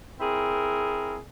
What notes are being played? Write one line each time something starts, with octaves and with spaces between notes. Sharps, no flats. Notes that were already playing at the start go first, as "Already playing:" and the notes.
C4 E4 G#4 A#4